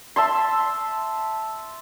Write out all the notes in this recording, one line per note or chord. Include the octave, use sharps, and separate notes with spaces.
E5 A5 C6